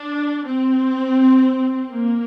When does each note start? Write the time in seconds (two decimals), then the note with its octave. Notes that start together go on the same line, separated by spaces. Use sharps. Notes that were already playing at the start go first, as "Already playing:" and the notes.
Already playing: D4
0.46 C4
1.91 A#3